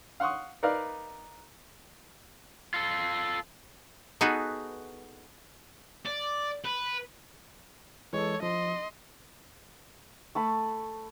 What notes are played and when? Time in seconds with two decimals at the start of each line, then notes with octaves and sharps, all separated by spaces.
0.20 F5 F#5 C6 C#6 D#6
0.63 D#4 A#4 B4 D5 F5
2.74 F4 A4
4.21 B3 D#4 F#4 G#4 A4 B4
6.05 D5
6.65 B4
8.13 E3 G#3 A4 C#5
8.43 F3 D#5 C6
10.35 A3 A5 B5